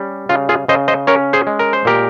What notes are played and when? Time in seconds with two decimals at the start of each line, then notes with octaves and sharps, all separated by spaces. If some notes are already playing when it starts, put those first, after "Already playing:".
Already playing: G3 C#4
0.29 C#3 F4
0.49 F4 G#4
0.68 C#3 C5 D#5
0.88 C5 D#5
1.07 C#4 A#4 C#5
1.33 G#4 C5
1.47 G#3
1.59 A#4
1.73 C5
1.85 A#2 G4 A#4